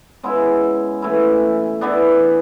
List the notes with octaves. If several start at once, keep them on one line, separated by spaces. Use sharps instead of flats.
C#3 G#3 B3 E4
E3 A3 E4
E3 B3 D4